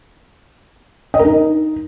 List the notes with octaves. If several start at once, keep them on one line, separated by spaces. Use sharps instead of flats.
D#5
A#4
D#4